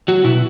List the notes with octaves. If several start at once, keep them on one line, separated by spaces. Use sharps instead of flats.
F#3 F#4
B2 E4